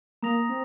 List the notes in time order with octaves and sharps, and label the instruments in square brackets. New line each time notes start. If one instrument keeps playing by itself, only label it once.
[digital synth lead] A#3 [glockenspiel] A#5 D#6 A#6 F7
[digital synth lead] C4